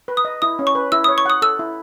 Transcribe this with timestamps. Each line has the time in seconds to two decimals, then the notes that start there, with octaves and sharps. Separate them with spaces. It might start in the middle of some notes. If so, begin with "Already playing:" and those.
0.08 B4
0.17 D#6
0.25 D#5
0.42 E4 D#6
0.59 C#4
0.67 C#6
0.75 B4
0.92 E4 E6
1.04 D#6
1.09 C#5
1.18 C#6
1.26 F#5 D#6
1.42 A4 E6
1.59 E4